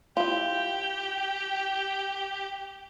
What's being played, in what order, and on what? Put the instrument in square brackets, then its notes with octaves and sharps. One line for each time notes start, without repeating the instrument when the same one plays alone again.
[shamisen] E4 F4 [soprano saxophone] G4 [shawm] G5